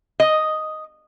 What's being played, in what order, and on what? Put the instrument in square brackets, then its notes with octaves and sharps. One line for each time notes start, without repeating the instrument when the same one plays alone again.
[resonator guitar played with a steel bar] D#5